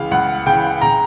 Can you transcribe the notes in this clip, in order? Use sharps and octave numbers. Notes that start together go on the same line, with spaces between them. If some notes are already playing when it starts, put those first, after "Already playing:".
Already playing: C#2 C#3 E3 F5
C#2 F#5
C#3 E3 G5
C#3 A#5